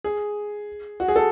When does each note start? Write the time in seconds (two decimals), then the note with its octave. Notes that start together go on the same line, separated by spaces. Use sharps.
0.04 G#4
1.00 F#4
1.08 G#4
1.16 A4